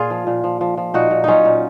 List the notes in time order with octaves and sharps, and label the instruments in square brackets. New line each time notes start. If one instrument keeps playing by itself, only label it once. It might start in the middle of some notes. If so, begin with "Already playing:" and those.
Already playing: [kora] A#2 F4 G#4
F3
A#2
F3
F3
F3
A#2 D#4 F#4
A#2
F#3 C#4 D#4 F4
A#2